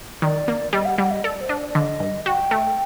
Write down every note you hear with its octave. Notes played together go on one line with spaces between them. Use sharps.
D#3 D5
A#3
G3 D#5
F#5
G3 F#5
D#5
A4 D5
C5
D4
D5
D5
D3 D#5
G2
F#4 G5
A3